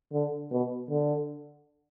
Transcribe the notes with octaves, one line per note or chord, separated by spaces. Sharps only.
D3
B2
D3